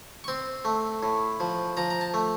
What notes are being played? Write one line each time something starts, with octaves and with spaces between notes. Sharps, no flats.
C#6
C4 C6
A3
A2
F3
F3 A#5
A#5
A5
A3